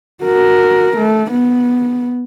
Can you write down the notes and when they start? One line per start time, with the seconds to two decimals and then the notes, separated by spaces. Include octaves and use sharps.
0.24 F#4 A#4
0.98 A3
1.31 B3